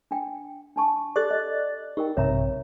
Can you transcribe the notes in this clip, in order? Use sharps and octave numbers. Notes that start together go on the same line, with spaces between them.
D4 G5
D4 A5 C#6
G4 A4 D5 F#6 A6
D#5
D#4 G4 A#4 G5
A#1 G2 C3 C#5 E5 A#5